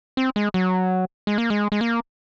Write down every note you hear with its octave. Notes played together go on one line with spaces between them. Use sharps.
C4
G#3
F#3
G#3
A#3
G#3
G#3
A#3